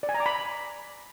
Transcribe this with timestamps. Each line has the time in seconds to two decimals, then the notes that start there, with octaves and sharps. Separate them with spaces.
0.03 D5
0.09 G#5
0.14 A#5
0.20 D6
0.26 B5